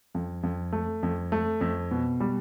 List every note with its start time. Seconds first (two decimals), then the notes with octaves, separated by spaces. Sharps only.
0.15 F2
0.43 F2
0.72 A3
1.03 F2
1.32 A3
1.61 F2
1.91 B2
2.20 G3